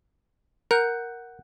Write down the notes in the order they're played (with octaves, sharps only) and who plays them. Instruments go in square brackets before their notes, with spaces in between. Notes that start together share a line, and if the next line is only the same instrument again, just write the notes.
[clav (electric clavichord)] A#4 [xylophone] F#5 F#6 G6